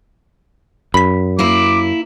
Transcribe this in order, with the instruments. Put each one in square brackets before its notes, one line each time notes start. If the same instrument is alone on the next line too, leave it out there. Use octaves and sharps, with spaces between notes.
[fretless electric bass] F#2 [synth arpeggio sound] B5 B6
[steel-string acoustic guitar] A#3 E4 [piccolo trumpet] D6